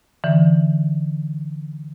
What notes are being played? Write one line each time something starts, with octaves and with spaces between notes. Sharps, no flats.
D3 E3